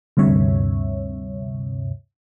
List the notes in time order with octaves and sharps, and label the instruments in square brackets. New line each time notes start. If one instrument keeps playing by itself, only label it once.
[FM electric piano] D2 G2 C3 C#5 E5